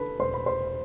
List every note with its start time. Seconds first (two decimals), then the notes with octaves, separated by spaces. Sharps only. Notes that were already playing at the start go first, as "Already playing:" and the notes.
Already playing: D3 A4 B4 B5
0.19 E1 C5 C6
0.34 B5
0.46 C5 C6